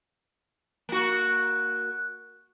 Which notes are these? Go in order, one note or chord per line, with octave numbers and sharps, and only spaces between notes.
A#3 F#4